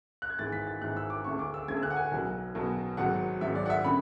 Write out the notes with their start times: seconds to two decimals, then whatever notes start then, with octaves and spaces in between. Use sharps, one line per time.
0.22 F#6
0.30 G#6
0.38 G#1 G#2 E3 G#3 A6
0.52 B6
0.67 A6
0.81 G#1 G#2 E3 G#3 F#6
0.97 E6
1.10 D6
1.24 D2 D3 G#3 C#6
1.39 D6
1.54 E6
1.68 D2 D3 G#3 G#6
1.77 E6
1.83 F#6
1.90 F#5
1.96 G#5
2.11 B1 B2 F#3
2.55 B1 B2 F#3
2.97 G#1 G#2 F#3 F#5
3.41 G#1 G#2 F#3 E5
3.55 D5
3.66 F#5
3.70 E5
3.85 D3 B5